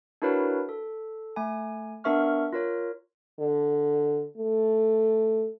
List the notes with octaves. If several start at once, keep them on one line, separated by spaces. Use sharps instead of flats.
D4 E4 F#4 A#4 B4 C#5
A4
A3 G#5
B3 D4 A#4 E5 C#6 F6
F4 A#4 C#5
D3
A3